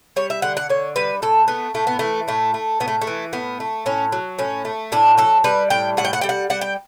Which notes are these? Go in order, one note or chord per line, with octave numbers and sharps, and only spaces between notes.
G3 C#5
E5
D3 F#5
F#5
D3 C#5
G3 B4
A2 A4
A3 B3
A2 A3
B3
E3 A3
A2 A3
A3
A2 B3
A3
A3
E3
A2 B3
A3
A2 C#4
F#3
A2 C#4
A3
A2 D4
F#3 A4
G3 B4
A2 G5
A2 F#5
G5
F#5
G3 G5
F#5
G3 F#5
G5